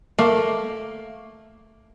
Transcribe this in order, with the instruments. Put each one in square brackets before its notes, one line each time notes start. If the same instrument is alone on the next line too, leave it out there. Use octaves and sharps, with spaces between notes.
[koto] A3 [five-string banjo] A#3